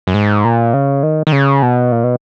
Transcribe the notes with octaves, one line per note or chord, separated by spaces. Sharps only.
F#2
G#2
A#2
C#3
D#3
D#3
C#3
B2
A#2
B2